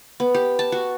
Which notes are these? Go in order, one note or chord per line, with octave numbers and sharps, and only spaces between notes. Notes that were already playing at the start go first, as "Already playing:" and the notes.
B3
G4
A5
F#4